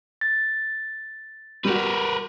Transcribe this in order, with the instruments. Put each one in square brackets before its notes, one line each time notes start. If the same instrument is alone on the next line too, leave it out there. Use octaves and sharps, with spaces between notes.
[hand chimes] A6
[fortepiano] G3 F#4 [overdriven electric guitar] A#4 B4